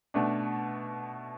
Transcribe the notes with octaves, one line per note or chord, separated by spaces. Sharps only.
B2 A3 D4